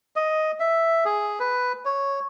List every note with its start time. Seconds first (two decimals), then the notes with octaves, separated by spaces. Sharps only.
0.16 D#5
0.60 E5
1.05 G#4
1.40 B4
1.85 C#5